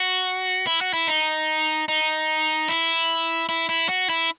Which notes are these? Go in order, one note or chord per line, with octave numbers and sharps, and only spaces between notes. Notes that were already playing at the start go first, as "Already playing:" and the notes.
Already playing: F#4
E4
F#4
E4
D#4
D#4
E4
E4
E4
F#4
E4